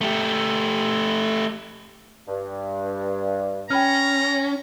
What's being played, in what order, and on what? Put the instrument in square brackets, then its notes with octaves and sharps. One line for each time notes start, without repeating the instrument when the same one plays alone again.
[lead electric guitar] A3 G4
[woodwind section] G2
[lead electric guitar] C#4 [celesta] G5 B5 F6 [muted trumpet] A#5